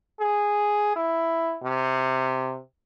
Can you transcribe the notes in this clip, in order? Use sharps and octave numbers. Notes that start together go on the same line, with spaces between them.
G#4
E4
C3